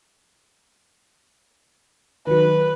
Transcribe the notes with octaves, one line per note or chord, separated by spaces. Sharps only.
D#3 F#3 B4